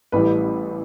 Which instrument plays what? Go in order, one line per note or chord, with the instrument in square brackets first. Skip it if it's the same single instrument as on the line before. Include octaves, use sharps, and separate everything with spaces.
[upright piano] A1 A2 E3 G3 B4